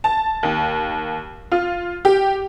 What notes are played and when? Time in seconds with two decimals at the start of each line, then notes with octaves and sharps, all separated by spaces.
0.04 A5
0.43 D#2
1.52 F4
2.05 G4